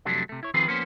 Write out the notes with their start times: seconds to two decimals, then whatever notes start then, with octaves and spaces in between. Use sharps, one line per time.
0.05 F2 C3 F#3 G3 A3 D4
0.29 C3 A3
0.43 E4 C#5
0.54 D#3 F3 C4 F4 G#4 B4
0.67 F3 A#3 B3 C#4 A#4 C5